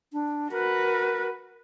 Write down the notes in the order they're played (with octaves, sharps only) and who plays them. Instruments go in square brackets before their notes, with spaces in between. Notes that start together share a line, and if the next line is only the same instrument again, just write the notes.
[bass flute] D4
[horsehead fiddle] F#4 B4 [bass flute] A#4